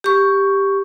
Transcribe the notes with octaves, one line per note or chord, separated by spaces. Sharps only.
G4 C#6